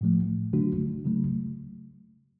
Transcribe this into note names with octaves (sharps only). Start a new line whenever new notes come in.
A2 F3 A3
D3 F#3 A3 D4 F#4
C#3 F#3 A3